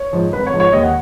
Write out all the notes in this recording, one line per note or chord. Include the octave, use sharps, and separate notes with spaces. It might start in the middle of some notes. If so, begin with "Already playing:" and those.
Already playing: C#5
G#2 F3
G#1 B4
C#5
G#2 F3
C#5
D#2 D#5
F#5